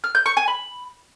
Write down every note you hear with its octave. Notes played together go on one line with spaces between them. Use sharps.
F6
G6
C#6
G#5
B5